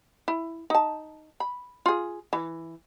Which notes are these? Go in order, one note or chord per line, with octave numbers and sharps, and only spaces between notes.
E4
D#4 A5
B5
F4 G#4
E3